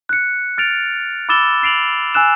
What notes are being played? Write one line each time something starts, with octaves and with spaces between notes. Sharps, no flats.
F#6 C#7
F6 A6 D7 F7
B5 D6 E6 A6 E7 G7
A6 C7 D7 F7 F#7
G#5 E6 F#6 E7